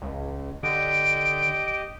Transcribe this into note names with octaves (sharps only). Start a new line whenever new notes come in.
C#2
D3 G4 D#5 D7